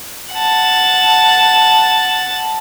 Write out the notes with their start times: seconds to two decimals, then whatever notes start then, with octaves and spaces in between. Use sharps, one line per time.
0.34 F#5 A5